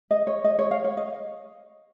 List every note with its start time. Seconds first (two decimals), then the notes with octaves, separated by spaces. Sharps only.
0.11 D#5
0.27 C#5
0.44 D#5
0.59 C#5
0.71 F5
0.84 C#5
0.97 D#5